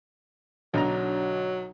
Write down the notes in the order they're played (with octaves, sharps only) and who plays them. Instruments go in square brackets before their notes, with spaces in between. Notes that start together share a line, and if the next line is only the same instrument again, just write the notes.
[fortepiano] B1 A#5 [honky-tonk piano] D3 D4 D#4 [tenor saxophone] F#3